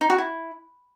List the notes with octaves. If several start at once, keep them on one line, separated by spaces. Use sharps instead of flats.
D#4
F#4
E4